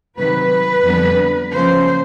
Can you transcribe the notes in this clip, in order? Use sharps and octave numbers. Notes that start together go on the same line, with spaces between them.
C3 D#3 F#3 B4
F2 D3 G3 B3
C#3 F3 A#3 C#4 C5